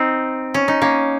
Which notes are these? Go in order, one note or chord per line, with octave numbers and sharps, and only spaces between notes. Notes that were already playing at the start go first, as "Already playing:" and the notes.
Already playing: C4 D#4
C#4
D#4
A#3 C#4